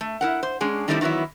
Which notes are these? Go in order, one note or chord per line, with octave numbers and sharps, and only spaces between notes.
A3
E4 A#4 F#5
C5
G#3 C#4 D4 G#4
D#3 G3 A3 C4 D#4 E4
D#3 E3 F#3 B3 E4